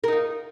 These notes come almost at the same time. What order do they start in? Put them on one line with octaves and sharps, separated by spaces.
A#4 D#4 F4